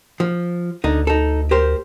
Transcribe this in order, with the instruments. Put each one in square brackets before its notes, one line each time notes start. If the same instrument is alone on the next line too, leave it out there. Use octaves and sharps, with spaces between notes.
[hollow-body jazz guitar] F3
[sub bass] D2 [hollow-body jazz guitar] D3 D#4
[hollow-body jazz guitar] D#4 A4
G4 A#4 C5